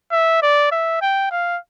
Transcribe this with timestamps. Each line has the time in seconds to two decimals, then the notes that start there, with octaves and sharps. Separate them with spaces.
0.12 E5
0.43 D5
0.72 E5
1.01 G5
1.31 F5